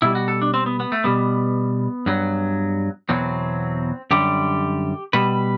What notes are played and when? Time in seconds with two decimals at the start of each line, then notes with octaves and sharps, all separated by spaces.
0.02 B2 G3 E4
0.15 F#4
0.28 A4
0.42 D4
0.54 C4
0.66 B3
0.80 B3
0.92 A3
1.04 B2 G3 B3
2.06 G2 F#3
3.09 E2 B2 F#3 C4
4.11 F#2 D3 G3 G4
5.13 B2 G3 B4